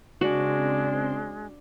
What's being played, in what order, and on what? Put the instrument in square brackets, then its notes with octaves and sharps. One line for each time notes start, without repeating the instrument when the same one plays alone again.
[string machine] C#3 C4 C6 [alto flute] G#3 [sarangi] D4 [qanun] F#4